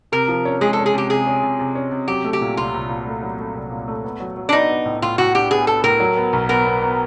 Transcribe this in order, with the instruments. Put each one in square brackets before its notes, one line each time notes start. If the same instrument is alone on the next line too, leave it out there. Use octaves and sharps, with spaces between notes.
[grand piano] C3 [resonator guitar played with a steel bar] A#4
[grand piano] F3
C#4
[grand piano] G#3 [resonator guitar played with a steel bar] G#4
[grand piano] C#4 [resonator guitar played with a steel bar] A4
[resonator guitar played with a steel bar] G#4
[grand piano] C3 [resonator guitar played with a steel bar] G4
[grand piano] C3 [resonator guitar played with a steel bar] G#4
[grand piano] C#4
C3
C3
C#4
C3
[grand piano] F#3 [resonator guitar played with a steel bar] G4
[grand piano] A3
[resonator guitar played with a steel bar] G4
[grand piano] A#2
[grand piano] C2 [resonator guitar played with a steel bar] F4
[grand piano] C2
A#2
A3
F#3
A3
C2
A#2
A3
B3
F#3
F#3
[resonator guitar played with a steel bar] D4
[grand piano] B3 [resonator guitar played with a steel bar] D#4
[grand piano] B3
A2
[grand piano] A2 [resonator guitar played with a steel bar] F4
[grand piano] A2 [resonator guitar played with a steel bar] F#4
[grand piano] D4 [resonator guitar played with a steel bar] G4
[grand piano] B3 [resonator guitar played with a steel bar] G#4
[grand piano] B3 [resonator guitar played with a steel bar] A4
[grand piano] A2 [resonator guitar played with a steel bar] A#4
[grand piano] F#3
B3
B1
[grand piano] B3 [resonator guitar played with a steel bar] A#4
[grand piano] B3
B3